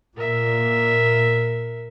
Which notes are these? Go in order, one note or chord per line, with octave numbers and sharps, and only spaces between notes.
A#2 A#4 E5